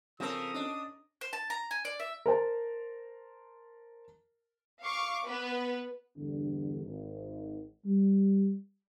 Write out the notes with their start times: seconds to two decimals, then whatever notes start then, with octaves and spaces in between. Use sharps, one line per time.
0.20 C#3 F3 C4 A4 A#4 D#6
0.54 C#4 D4 D#5
1.21 C5
1.33 A5
1.50 A#5
1.71 G#5
1.85 D5
2.00 E5
2.26 A#4 C5 A5 A#5
4.83 F5 C#6 D6
5.26 B3 B4
6.16 E2 G2 D3 D4
6.85 G#1
7.85 G3